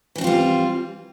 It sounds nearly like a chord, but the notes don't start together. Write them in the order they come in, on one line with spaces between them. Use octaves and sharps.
E3 D#4 C4 F4 G3